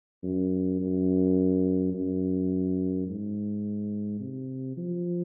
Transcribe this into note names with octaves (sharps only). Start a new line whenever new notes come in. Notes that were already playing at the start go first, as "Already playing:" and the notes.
F#2
F#2
F#2
G#2
C3
F3